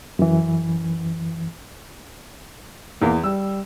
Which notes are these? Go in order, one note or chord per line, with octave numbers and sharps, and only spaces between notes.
F#2 E3
E2 A#3
G3 E6